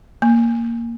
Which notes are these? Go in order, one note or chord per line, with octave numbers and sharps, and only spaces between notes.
A#3